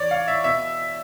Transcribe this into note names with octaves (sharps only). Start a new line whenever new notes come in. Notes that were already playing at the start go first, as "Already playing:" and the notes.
Already playing: E3 C#5 D5
F5
E5
B2 E5